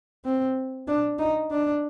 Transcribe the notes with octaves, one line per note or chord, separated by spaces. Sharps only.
C4
D4
D#4
D4